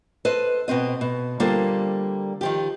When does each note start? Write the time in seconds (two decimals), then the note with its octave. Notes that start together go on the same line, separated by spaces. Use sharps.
0.25 A4 B4 C5 D#5
0.68 B2 B3 C4 D#5
1.01 B2
1.40 D3 G3 A#3 F4 A4 C5
2.41 D#3 F3 G4